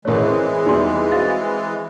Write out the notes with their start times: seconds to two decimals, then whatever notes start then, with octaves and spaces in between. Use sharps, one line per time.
0.05 A1 E3 G#3 A3 A#4 C#5
0.24 C4
0.66 E2 G3 D#4 C6
1.12 C4 F#4 F5 A6